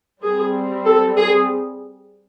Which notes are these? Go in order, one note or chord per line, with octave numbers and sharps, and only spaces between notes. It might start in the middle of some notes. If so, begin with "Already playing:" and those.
G3 C4 G#4
A4
G#4